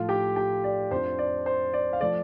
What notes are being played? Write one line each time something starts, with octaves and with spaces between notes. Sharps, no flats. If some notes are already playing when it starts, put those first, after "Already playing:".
Already playing: A2 F3 A3 F4 F5
G4 G5
G4 G5
D5
F2 F3 D4 F4 C5
D5
C5
D5
F5
F3 A3 D5